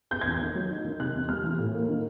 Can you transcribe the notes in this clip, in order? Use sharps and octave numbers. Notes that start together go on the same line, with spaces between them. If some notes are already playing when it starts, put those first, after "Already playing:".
B3 G6
G#6
E2
G6
D#3
F#3
D#4
D#3
C3 F#6
E2
G3 F6
E3
A2
A#3
D#3